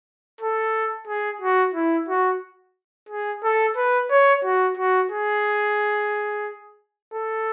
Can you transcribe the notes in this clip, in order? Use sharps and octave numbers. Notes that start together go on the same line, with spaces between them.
A4
G#4
F#4
E4
F#4
G#4
A4
B4
C#5
F#4
F#4
G#4
A4